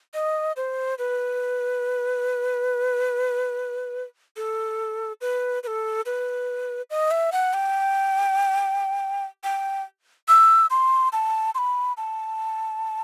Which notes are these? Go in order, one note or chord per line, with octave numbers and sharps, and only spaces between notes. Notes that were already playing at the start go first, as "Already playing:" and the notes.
D#5
C5
B4
A4
B4
B4
A4
B4
D#5
E5
F#5
G5
G5
E6
C6
A5
C6
B5
A5